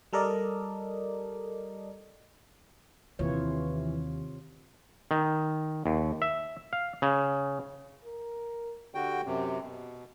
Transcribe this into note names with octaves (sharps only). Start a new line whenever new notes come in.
G3 A4 A#4 D5 D#5
D#2 C3 E3 F4 C#5
D#3
D#2
E5
F5
C#3
A#4
D3 F#4 G4 G5
F#2 C3
B2